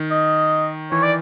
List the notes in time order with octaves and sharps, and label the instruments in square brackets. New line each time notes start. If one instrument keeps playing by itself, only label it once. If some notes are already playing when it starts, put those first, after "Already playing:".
Already playing: [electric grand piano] D#3
[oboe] D#5
[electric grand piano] E3 [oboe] C#5
[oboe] D5